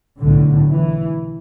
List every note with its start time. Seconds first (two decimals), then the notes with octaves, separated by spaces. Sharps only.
0.19 B1 A2 D3
0.69 E3